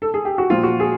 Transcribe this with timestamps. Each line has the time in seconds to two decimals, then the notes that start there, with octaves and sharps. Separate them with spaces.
0.02 A4
0.14 G#4
0.25 G4
0.38 F#4
0.50 A#2 F3 F4
0.63 F#4
0.80 G#4